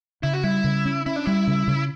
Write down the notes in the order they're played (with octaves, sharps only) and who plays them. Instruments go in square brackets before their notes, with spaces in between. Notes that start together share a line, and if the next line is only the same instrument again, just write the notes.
[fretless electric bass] C#3 [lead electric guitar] E4
[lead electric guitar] F#4
[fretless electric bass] G3 [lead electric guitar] E4
[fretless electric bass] C#3
C#4
[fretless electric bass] C#4 [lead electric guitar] E4
[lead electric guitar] D4
[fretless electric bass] G3 [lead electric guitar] E4
[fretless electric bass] C#3
C#3